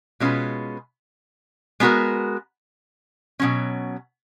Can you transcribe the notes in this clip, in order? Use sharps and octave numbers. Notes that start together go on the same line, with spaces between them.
B2 G#3 C#4 F4 B4
G#3 B3 F#4 A#4
B2 F#3 C#4